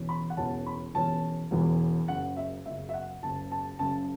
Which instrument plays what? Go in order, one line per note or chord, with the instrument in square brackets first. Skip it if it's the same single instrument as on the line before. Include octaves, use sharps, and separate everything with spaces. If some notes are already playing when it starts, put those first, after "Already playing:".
Already playing: [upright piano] E1 E2 E3 C#4
B5
F#5
E1 E2 E3 C#4 A5
B5
E1 E2 E3 C#4 A5
E1 E2 E3 C#4
F#1 F#2 C#3 F#5
E5
F#1 F#2 C#3 E5
E5
F#5
F#1 F#2 C#3 A5
A5
F#1 F#2 C#3 A5